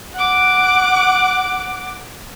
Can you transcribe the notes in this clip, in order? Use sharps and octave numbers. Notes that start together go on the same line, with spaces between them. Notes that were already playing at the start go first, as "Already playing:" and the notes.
F#5 D6